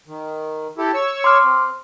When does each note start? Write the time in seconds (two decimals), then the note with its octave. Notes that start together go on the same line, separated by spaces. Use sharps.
0.08 D#3
0.78 E4 G4 A4
0.94 C#5 C#6 E6
1.24 C6 D6 F6
1.44 C4